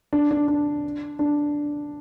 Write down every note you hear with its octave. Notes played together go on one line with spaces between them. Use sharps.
D4
D4
D4
D4